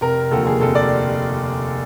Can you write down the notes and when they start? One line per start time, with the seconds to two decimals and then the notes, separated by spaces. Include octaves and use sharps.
0.01 F1 A#4
0.31 D#2 D3 F3 A4
0.47 G#4
0.61 F1 A4
0.75 D5